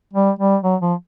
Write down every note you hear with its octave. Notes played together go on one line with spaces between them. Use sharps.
G3
G3
F#3
F3